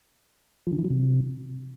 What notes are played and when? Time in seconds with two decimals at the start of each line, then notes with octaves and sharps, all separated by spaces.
0.67 F3
0.73 D3
0.79 E3
0.84 F#3
0.90 C3